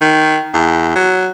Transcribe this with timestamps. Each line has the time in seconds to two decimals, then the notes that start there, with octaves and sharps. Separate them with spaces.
0.01 D#3
0.54 E2
0.96 F#3